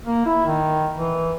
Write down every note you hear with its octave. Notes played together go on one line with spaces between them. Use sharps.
A#3
E4
D#3
E3